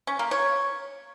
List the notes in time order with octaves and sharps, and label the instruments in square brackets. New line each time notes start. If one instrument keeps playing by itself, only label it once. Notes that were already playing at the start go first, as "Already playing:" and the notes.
[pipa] C#4
A#3
C#5